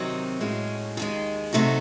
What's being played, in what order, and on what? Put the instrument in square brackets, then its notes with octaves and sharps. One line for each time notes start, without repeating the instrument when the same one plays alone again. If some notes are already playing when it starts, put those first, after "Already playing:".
Already playing: [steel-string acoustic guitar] C3 D#3 F#3 C4 D#4
A2 G#3 C#4 F#4
D#2 D#3 G#3
C3 F#3 A3 D#4 F#4